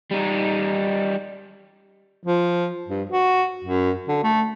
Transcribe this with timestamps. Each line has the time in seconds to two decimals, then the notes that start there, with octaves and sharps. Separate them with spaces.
0.11 G3 D#4
2.24 F3
2.88 G2
3.10 F#4
3.65 F#2
4.08 D3
4.23 A3